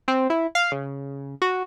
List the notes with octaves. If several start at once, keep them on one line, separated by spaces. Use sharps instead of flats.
C4
E4
F5
C#3
F#4